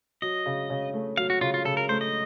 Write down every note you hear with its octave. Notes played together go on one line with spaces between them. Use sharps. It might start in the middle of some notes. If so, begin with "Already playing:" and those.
F#3 D#5
C#3
C#3
A3
F#3 F5
F#4
C#3 F4
F4
C#3 A4
A#4
A3 C5
D#5